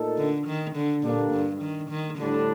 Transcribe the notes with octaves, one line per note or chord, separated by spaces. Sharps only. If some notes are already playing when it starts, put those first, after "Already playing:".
Already playing: A#2 A3 D#4 A4
D3
D#3
D3
A#2 D3 G3 A#3 D4
G2
D#3
D#3
A2 D3 G3 D4